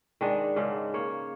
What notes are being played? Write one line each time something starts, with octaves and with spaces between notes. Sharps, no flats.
D#3 G#3 D4
G#2 C#3
A#3 C#5